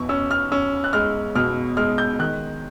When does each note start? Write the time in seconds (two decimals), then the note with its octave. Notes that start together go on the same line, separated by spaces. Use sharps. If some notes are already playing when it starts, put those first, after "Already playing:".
Already playing: E2 B2 C#6
0.09 C#4 E6
0.31 F6
0.52 C#4 E6
0.84 F#6
0.93 G#3 F6
1.35 B2 F6
1.77 G#3 F6
1.98 G6
2.19 D#3 F#6